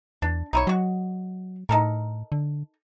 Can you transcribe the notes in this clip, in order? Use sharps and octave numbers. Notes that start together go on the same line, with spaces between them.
E2 D4
B1 D#4 E4 C#5
F#3 G#3 F#4
A2 D#4 A4 A#4
D3